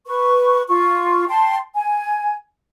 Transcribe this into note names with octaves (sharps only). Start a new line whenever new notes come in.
B4 C#6
F4 C#6
G5 A5 C6
G#5